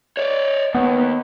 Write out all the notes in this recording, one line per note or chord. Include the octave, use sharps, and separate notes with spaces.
C#5 D5
D#2 B3